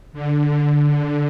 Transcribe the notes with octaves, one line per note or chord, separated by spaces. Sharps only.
D3